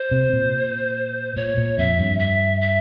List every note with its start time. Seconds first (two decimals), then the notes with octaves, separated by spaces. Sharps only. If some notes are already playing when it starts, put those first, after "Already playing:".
Already playing: C5
0.11 C3
0.33 A#2
1.36 A#2 C#5
1.57 A#2
1.78 F2 E5
1.99 G2
2.19 E5
2.61 E5